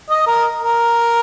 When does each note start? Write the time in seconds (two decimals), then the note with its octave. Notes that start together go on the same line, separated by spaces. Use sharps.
0.10 D#5
0.27 A#4
0.61 A#4